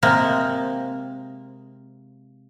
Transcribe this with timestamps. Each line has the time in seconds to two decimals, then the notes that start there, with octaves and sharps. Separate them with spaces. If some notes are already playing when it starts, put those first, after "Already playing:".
0.03 C3 G#3 A#3 C4